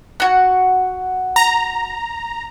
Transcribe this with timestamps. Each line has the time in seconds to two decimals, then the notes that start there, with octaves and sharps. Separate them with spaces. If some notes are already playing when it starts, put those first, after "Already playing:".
0.20 F#4 F#5
1.36 A#5